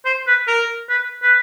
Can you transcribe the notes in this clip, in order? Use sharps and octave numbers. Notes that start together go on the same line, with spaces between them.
C5
B4
A#4
B4
B4